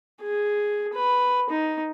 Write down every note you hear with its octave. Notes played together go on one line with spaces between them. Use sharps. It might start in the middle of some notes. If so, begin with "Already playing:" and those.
G#4
B4
D#4